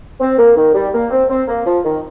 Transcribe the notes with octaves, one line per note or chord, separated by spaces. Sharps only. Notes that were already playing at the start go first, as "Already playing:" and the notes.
C4
A#3
D#3
G3
A#3
C4
C4
A#3
F3
D#3